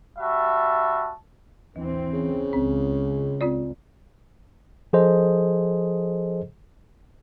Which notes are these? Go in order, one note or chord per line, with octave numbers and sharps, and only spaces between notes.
G3 F#4 E5 A5
D#2 E3 C4
C#3
C#2 C4
C4 F4 D5
F3 G#4 A4 C5 D#5